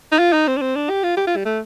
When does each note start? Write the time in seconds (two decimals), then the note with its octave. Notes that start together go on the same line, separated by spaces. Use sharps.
0.12 D#4
0.19 F4
0.33 D#4
0.47 C4
0.57 D4
0.62 C4
0.76 D4
0.90 G4
1.04 F4
1.17 G4
1.27 F4
1.36 G3
1.45 A3